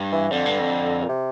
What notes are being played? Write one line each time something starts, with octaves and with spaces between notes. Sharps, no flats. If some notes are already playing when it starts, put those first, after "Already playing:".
Already playing: G2
E3
F2 D3
G2
F2
A#2
C3